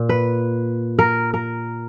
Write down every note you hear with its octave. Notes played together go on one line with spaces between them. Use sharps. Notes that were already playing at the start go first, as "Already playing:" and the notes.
Already playing: A#2
B4
A#4
A#4